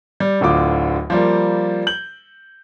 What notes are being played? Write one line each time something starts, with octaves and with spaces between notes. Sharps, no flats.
G3
D1 D2 D3 F4 D6
F3 G3 A#3
G6 F#7